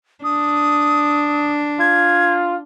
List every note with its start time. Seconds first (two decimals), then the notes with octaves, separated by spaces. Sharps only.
0.24 D4 D#6
1.80 F4 G#6